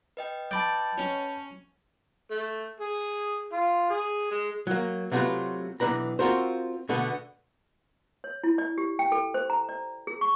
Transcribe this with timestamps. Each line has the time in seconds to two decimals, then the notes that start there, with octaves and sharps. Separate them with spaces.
0.17 B4 D#5 G5
0.51 D5 A5 B5 G6
0.98 C#4
2.31 A3
2.81 G#4
3.53 F4
3.90 G#4
4.32 G#3
4.67 F#3 A#3
5.12 C3 F#3 A3 C4 F4 B4
5.80 B1 E3 F3 D4 B4 A#5
6.19 C4 F4 F#4 A#4 C5
6.89 B2 D3 A3 B3
8.24 C#5
8.44 E4
8.58 D5
8.78 G4
8.99 G5
9.12 A4
9.34 C5
9.50 A#5
9.69 D5
10.07 G#4
10.21 C#6